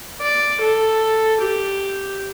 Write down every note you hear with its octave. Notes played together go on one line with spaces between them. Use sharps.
D5
A4
G4